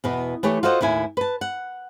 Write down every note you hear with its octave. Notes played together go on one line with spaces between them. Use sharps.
E2 B2 B3
E3 A3 G4 C#5
F4 F#4 A4 C5 D#5 F#5
D#2 A2 E4 G#5
B4 A5
F#5